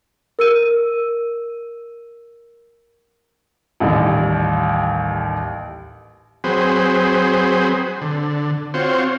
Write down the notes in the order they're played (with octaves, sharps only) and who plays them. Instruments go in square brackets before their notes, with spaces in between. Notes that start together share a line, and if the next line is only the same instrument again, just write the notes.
[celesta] A#4 E6 D#7
[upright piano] A1 D#2 G3
[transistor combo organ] F#3 C4 G#4 B4 C5
D3
C4 F4 F#4 C5 C#5